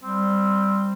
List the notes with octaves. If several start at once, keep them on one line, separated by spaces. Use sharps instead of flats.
G3 C4